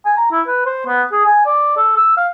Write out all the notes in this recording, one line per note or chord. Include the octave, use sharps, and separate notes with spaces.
G#5
A#5
E4
B4
C5
B3
G#4
G#5
D5
A4
E6
F5